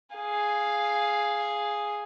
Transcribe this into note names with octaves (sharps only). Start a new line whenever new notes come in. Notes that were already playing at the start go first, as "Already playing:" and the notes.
G#4 F5